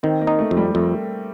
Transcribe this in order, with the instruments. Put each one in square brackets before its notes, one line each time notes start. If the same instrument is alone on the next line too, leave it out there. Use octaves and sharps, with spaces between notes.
[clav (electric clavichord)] D#3 [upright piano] C4
[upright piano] A#3
[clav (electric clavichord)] D#4
[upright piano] A3
[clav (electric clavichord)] F2
[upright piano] G3
[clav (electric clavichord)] F2 [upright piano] A3